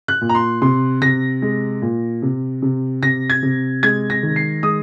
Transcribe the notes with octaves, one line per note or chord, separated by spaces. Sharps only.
F#6
A#2
A#5
C6
C3 C6
C3 A#6
G#3
A#2
C3
C3
C3 A#6
G#6
C3
G#3 G#6
A#6
D#3
C7
G#3 D#6